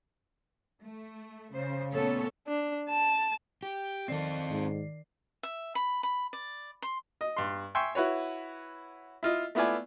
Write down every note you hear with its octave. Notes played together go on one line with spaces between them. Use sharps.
A3
C#3 C5
A#2 A3 B3 C#4 A4 C#5
D4
A5
G4
D#3 C4 A4 D5 C7
G#2
E5
B5
B5
D5
C6
D#5
G2 C6
E5 G5 G#5 C6 C#6
E4 F#4 B4 C#5
E4 F4 D#5
A3 B3 E4 F4 D5 G#5